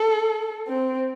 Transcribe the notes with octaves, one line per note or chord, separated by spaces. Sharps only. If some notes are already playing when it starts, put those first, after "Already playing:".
Already playing: A4
C4